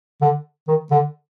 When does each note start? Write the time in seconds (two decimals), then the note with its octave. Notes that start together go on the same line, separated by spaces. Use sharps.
0.21 D3
0.68 D#3
0.91 D3